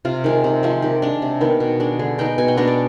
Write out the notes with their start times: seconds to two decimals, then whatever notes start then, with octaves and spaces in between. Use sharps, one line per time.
0.05 C3 F4
0.24 D#3 G#3
0.44 C3
0.63 F3 G#3
0.82 D#3 G4
1.02 G#3 D4
1.22 C3
1.41 D#3 B3
1.60 B2
1.80 G#3 D4
1.99 D3 G#4
2.18 G#3 B3 D#4 G5
2.38 B2 G#5
2.48 G5
2.57 G#3 B3 D4 D#5
2.67 D5